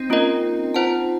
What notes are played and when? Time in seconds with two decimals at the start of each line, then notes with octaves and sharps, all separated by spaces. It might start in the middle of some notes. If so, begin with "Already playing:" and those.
Already playing: C4 D#4
0.10 A#3 C#4 F4 A#4 D#5
0.74 F4 C5 F#5 A5